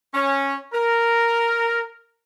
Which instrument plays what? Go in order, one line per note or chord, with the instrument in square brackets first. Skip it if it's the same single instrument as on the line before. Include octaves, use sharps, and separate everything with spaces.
[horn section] C#4
A#4